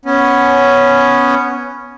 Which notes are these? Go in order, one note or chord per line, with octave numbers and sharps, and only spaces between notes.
B3 C#4